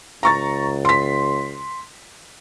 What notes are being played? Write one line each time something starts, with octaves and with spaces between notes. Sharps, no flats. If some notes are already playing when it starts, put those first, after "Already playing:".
C#2 A#5 C#6 A6
C6 B6